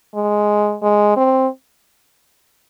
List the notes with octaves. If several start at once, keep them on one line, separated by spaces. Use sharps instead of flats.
G#3
G#3
C4